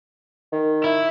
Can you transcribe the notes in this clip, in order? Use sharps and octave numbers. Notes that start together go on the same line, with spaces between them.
D#3
E4